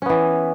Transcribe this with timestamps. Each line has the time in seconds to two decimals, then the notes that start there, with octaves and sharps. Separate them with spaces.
0.02 C#4
0.06 B3
0.10 E3